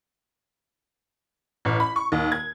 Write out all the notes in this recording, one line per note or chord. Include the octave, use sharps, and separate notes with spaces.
A1
B5
C#6
D#2
G#6